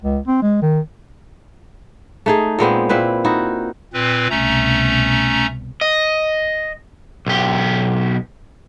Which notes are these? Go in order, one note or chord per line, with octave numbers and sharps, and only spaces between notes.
C#2
C4
G#3
D#3
A3 D#4 G#4
A#2 G#3 B3 C4
A#2 C4 E4 B4
D#4 E4 F#4
A#2 C4 B4
C2 B2 A3 C#4 A#5
D#5
B1 G4